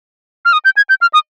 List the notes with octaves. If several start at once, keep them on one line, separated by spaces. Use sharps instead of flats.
F6
D#6
G6
G#6
G6
F6
D#6